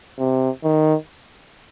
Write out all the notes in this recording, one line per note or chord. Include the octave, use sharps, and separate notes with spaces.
C3
D#3